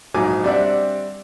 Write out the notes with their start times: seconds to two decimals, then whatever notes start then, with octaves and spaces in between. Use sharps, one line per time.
0.14 A#1 G#2 F#3 D#4 G#5 D6
0.44 G3 C4 D4 D5 E5 F#5